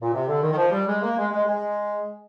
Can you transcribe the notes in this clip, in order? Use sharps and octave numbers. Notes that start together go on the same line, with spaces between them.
A#2
C3
D3
D#3
D#3
F3
G3
G#3
A#3
G#3
G#3
G#3